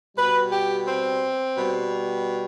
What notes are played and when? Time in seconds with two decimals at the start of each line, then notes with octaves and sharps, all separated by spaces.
0.16 B2 G3 B4
0.51 G4
0.86 C4
1.55 B2 G3